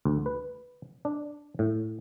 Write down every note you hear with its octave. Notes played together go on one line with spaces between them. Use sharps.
D2
B4
D4
A2